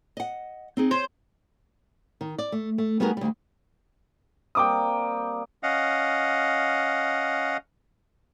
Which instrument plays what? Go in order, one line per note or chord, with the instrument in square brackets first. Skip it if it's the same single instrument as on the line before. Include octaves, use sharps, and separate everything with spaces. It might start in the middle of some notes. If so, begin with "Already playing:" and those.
[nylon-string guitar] D#5 F#5
C4 D#4 G#4
[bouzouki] C5 [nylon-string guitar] C#5
[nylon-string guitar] D#3
D5
A3
A3
G3 B3 D#4 F#4 G#4 A#4
D2 G3
[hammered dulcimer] G3 A#3 C4 [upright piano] G5 D6 D#6
[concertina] C#4 D#5 F5 F#5